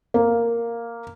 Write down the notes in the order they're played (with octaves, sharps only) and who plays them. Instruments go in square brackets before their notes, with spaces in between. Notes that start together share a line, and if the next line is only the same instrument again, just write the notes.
[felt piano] A#3